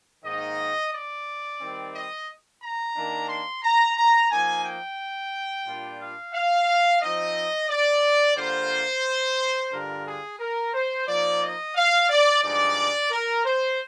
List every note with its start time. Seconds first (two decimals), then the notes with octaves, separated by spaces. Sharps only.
0.25 G#2 D#3 A#3 D#4 D#5
0.92 D5
1.60 D#3 G3 C4
1.94 D#5
2.62 A#5
2.95 D#3 A#3 D4
3.29 C6
3.63 A#5
3.97 A#5
4.30 F3 A#3 D#4 G#5
4.65 G5
5.66 A#2 G3 D4 F4
6.00 F5
6.34 F5
7.01 F3 C4 D#4 D#5
7.69 D5
8.37 D3 G3 A#3 F4 C5
9.72 G2 D3 G3 D4 F4 A#4
10.06 G#4
10.40 A#4
10.74 C5
11.08 F3 A#3 D#4 D5
11.42 D#5
11.76 F5
12.09 D5
12.43 G2 F3 G#3 D#4 D5
13.11 A#4
13.44 C5